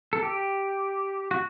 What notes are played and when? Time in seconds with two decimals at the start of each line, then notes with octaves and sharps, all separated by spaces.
0.13 A4
0.23 G4
1.31 F#4